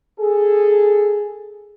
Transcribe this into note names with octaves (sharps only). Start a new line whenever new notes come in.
G#4 A4